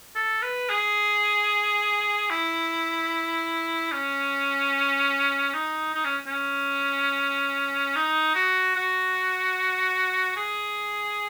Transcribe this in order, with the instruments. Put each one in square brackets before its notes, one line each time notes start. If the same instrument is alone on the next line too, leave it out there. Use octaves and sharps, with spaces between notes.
[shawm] A4
B4
G#4
E4
C#4
D#4
D#4
C#4
C#4
D#4
F#4
F#4
G#4